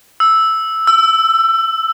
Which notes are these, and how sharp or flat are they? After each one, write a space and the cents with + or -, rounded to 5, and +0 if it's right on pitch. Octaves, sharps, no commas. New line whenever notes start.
E6 -5
E6 +20